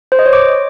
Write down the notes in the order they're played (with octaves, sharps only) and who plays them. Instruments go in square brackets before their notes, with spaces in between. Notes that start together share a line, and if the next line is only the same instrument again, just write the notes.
[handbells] C5
D#5
C#5
D6